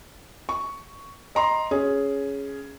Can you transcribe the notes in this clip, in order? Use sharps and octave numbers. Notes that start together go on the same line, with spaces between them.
C#6
D#5 A#5 C6
C#4 G#4